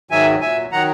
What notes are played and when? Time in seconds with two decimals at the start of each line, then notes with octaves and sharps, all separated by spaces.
0.11 G#2 D#3 F#3 E5 G#5
0.41 A#2 F#3 E5 G#5
0.72 D#3 F#3 F#5 A#5